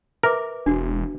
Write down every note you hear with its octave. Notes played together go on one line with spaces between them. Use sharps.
A#4 B4 E5 D6
E1 D4 F#4